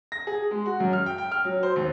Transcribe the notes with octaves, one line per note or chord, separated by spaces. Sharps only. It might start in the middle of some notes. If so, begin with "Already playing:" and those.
A#6
G#4
G#3
F#4
F#2
F6
G5
G5
F6
F#3
C5
D#2